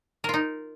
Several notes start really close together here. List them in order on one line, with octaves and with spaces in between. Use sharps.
A#4 F4 D#4